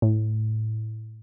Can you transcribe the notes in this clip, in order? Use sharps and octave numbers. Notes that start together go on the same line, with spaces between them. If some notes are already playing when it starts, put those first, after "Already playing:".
A2